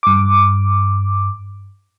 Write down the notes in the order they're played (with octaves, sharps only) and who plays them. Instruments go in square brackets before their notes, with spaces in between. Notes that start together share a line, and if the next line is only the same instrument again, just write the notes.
[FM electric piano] G2 D6